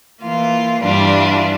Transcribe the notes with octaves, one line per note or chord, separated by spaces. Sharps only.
E3 A#3 F4
G2 E3 G3 D4 F4